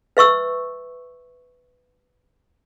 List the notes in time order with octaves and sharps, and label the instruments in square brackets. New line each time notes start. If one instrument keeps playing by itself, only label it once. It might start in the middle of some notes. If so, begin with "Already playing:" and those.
[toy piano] B4 E5 C#6 E6